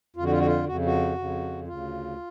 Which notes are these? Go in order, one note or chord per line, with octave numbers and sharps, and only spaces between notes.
F2 F4
D3 F#4
F4
F#4
F4
F2 C#3 F#4
F#4
F2 C#3
D2 C#3 F4